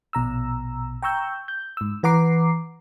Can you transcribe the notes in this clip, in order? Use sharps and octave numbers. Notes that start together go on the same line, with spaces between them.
A#1 B2 A#5 E6
G5 A#5 C#6 E6 G6
G6
G#2 E6
E3 B4 F#5 A#5 D6 C7